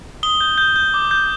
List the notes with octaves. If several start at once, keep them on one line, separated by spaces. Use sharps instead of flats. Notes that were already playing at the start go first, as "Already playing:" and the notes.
D#6 G7
G6
G6
G6
D6
G6